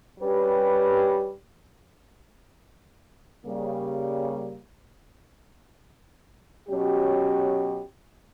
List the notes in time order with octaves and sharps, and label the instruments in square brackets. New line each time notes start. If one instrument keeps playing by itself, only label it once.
[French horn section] G3 C#4 G4 B4
C#3 G3 A#3
B2 F#3 C#4 G4